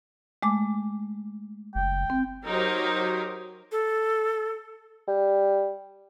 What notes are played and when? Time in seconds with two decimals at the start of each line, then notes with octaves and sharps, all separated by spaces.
0.43 G#3 A3 D6
1.75 F#1 G5
2.10 C4
2.45 F#3 D#4 G4 A#4 C5
3.72 A4
5.08 G3